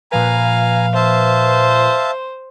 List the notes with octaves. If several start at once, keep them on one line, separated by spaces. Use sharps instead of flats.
A#2 F3 B4 F5 G#5 A#5
C5 E5 F5 A5